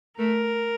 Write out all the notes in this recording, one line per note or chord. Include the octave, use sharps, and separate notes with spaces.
A3 A#4